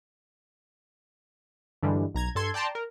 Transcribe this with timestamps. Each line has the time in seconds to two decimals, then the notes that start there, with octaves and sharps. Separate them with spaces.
1.83 G2 D3 E3 G3 G#3
2.15 B1 A#5 G#6
2.35 G2 A4 C6 G#6
2.54 D5 G5 A5 A#5 C6
2.75 A#4